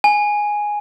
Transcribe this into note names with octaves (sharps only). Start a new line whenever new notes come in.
G#5